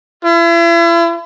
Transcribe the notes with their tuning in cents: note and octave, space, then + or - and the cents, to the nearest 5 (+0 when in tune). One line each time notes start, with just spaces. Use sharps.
E4 +40